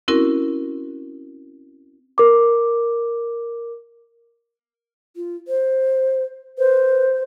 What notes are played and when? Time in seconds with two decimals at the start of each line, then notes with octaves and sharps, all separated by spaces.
0.08 C4 C#4 E4 F#4 A#4
2.18 A#4 D6
5.16 F4
5.48 C5
6.58 B4 C5